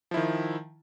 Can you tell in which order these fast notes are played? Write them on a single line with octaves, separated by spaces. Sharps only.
F3 E4 D#3